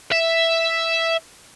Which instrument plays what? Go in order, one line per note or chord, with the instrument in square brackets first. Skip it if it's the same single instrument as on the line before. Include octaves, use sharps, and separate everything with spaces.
[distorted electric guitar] E5